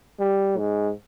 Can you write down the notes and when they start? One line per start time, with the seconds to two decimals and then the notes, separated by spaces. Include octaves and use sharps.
0.19 G3
0.57 G#2